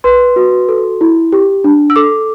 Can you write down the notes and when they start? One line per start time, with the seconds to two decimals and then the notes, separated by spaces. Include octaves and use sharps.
0.04 B4 C6
0.36 F#4
0.69 A4
1.01 E4
1.33 G4
1.64 D4
1.90 E6
1.96 A4 D6